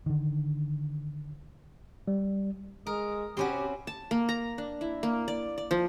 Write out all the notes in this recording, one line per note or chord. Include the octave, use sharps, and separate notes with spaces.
D3 D#3
G3
G#3 A#4 D#6
C3 C4 C#4 F#4 G4 B5
A5
A#3
A#5
D4
E4
A#3
D5
D5
F3